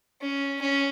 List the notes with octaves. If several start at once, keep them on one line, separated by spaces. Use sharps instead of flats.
C#4
C#4